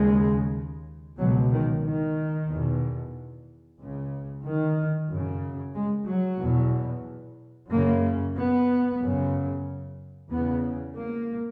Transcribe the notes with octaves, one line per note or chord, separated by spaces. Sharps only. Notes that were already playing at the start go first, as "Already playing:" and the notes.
Already playing: D#2 C#3 G#3
C#2 B2 F#3
D#3
D#3
E2 B2
C#2 C#3
D#3
F#2 C#3
G#3
F#3
E2 B2
F#2 C#3 A#3
B3
F#2 C#3
E2 C#3 B3
A#3